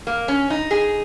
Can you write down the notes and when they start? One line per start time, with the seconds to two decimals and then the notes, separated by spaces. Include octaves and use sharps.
0.07 A#3
0.28 C#4
0.50 D#4
0.71 G#4